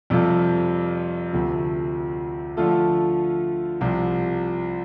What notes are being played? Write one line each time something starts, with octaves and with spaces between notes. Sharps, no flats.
F2 C3 G3 F4 A4
D2 C3 F3 A3
D3 F3 A3 F4 A4
C2 C3 F3